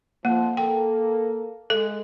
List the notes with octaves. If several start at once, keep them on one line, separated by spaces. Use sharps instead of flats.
F2 F3 A#3
A#3 A4 G5
G#3 A4